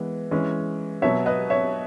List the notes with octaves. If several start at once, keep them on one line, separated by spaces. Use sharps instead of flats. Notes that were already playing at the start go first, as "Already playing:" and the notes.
Already playing: E3 G#3 B3
E3 G#3 C#4
B2 F#3 B3 C#5 E5
B4 D#5
C#5 E5